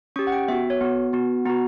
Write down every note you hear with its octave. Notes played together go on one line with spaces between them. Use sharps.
C#4 G4 C#6
F#5
G5
B3 F#4 E5
C#5
B3 F#4
B3 F#4
B3 F#4 A#5